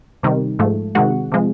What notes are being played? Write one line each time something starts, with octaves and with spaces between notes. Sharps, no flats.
C3 D#3 G3
G#2 F3 A3
C3 D#3 G#3 F#4 F#5
C3 F3 G#3